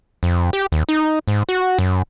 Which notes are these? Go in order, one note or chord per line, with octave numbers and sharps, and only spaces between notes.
F2
G4
D#2
D#4
G#2
F#4
F#2